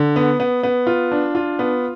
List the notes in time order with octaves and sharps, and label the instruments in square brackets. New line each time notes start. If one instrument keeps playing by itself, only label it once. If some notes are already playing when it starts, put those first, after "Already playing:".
Already playing: [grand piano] D3
B3
B3
B3
F4
D4
F4
B3